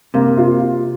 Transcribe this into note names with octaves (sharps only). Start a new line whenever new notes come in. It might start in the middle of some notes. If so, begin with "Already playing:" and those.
C3 A#3
F4